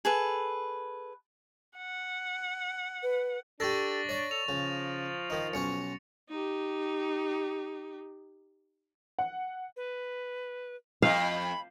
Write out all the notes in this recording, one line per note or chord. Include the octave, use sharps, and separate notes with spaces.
G#4 A4 B4
F#5
B4
D4 G4 A4 C#6 A6 A#6
C#5 D5
A4 F7
C#3 F3
D#3 D#4
B1 C#4 C#5 C#7
D#4 G4
F#5
B4
F2 F5 B5